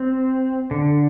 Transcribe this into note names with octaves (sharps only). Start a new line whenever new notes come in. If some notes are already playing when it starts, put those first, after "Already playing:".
Already playing: C4
D3